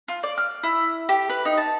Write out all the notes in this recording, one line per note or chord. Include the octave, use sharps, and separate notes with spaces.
F4
D5
F6
E4
G4
B4
D#4
A5